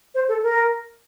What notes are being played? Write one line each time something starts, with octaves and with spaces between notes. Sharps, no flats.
C5
A4
A#4